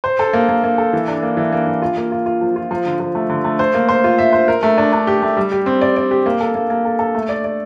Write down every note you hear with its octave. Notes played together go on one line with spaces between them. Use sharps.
C5
A4
A#3
A#3
A#3
A4
E3
D4
A#3
E3
A#3
E3
F4
A#3
F4
F4
F3
F4
F3
D3
F3
A3
D3
A3
C5
A#3
C5
F4
E5
C5
A#4
A3
D4
D4
G4
A3
G3
G4
C4
D5
D5
G4
A#3
A4
A#3
A#3
A4
A4
A3
D5
D5